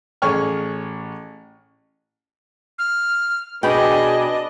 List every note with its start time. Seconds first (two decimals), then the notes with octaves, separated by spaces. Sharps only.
0.22 A1 G#4 C#5 G#5 C#6 F6
2.79 F6
3.63 B2 D4 G#4 D#5 G5 B5